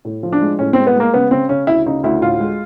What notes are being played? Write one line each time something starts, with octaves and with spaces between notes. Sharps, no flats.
A2
F3
D4
G#3
A2 C#4
G#3 C4
B3
G#3 A#3
C#3 B3
C#3 C4
C#3 C#4
D2 E4
C#3 D#4
D2 E4
A2 F4
G#3